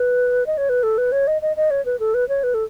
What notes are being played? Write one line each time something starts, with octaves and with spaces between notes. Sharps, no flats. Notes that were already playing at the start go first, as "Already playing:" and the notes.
Already playing: B4
D#5
C#5
B4
A4
B4
C#5
D#5
D#5
D#5
C#5
B4
A4
B4
C#5
B4
A4